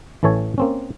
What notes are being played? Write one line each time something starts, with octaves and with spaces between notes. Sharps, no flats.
A1 E3 A4 C#5 G#5
A#3 C4 C#4